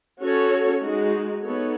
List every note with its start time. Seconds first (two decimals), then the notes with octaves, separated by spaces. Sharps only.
0.21 C#4 F#4 A4 C#5
0.82 G#3 D#4 F#4
1.42 B3 D#4 A4 C#5